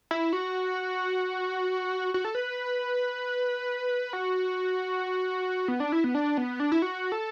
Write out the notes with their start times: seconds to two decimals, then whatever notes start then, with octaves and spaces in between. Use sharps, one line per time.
0.11 E4
0.33 F#4
2.14 F#4
2.25 A4
2.35 B4
4.13 F#4
5.68 B3
5.80 D4
5.92 E4
6.04 B3
6.15 D4
6.38 B3
6.60 D4
6.72 E4
6.82 F#4
7.12 A4